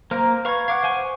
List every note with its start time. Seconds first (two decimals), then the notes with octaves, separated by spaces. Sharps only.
0.11 A#3 A#4 C5 A#5 F6
0.45 B4 F5 C#6 G#6
0.68 F5 F#5 D6 G#6
0.83 C5 G#5 C#6